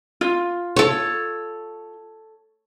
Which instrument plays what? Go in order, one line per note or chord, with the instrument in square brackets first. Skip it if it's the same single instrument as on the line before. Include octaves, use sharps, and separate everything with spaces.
[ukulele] F4
[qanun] A4 C#5